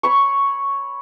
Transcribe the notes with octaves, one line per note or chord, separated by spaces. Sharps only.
C#5 B5 C#6